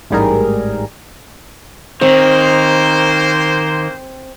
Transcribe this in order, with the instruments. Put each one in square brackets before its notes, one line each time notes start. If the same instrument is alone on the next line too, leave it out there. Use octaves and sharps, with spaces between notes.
[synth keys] A1 G#2 G3 G#4 A#4
[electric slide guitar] D#3 [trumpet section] A#3 C5 [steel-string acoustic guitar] C4